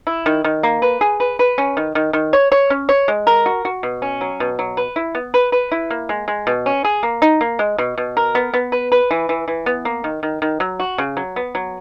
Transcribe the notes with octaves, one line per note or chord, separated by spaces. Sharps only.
E4
D#3
D#3
A#3
B4
G#4
B4
B4
C#4
D#3
D#3
D#3
C#5
C#5
C#4
C#5
G#3
A#4
F#4
F#4
B2
C#4
F#3
B2
F#3
B4
E4
B3
B4
B4
E4
A#3
G#3
G#3
B2
C#4
G#4
A#3
D#4
A#3
G#3
B2
B2
A#4
B3
B3
B4
B4
E3
E3
E3
B3
A#3
D#3
D#3
D#3
F#3
F#4
C#3
F#3
B3
F#3